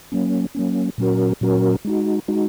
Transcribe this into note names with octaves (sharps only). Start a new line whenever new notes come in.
F#3 A#3 C#4
F#3 A#3 C#4
A#2 F#3 C#4 F#4 A#4
A#2 F#3 C#4 F#4 A#4
G#3 D#4 F#4
G#3 D#4 F#4